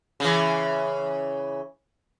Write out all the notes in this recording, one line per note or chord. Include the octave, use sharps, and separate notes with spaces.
C#3 E3